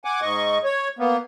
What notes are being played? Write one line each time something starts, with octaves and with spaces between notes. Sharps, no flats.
F#5 G#5 D6
G#2 D#5 C#6
C#5
A#3 B3